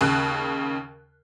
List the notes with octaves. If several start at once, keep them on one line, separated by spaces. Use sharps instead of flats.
D#2 C#3 F#6